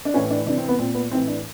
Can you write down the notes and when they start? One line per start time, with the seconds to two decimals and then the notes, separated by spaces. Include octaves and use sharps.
0.05 D4
0.14 A2 E3 C#4
0.30 D4
0.46 C3 E3 D4
0.58 C4
0.68 B3
0.78 A#2 C4
0.95 B3
1.11 A2 E3 C4
1.27 D4